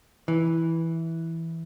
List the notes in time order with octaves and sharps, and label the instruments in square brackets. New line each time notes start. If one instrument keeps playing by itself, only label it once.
[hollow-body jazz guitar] E3